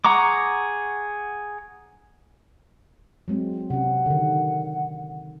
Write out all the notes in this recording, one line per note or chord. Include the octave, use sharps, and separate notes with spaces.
G#4 F#5 A#5 C#6 D6
F#3 G#3 C4
C3 C#4 F#5
D3 D#3